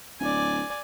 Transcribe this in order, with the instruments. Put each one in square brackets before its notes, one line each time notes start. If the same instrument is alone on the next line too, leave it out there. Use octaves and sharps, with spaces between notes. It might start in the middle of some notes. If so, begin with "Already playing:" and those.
[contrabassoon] D1 [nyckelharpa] D5 G#5